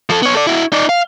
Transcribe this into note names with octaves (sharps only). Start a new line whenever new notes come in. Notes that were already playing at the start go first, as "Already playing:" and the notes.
F3 A4
B3 C#5
A4 D5
E4 F#4
D#4 D5
F5